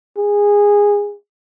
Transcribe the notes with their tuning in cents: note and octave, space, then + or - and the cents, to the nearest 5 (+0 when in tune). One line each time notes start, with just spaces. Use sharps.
G#4 -15